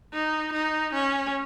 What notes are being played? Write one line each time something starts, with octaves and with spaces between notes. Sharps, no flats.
D#4
D#4
C#4